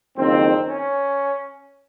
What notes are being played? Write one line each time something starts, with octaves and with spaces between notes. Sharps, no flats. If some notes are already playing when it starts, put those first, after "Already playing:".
F#1 F2 D#3 C4
C#4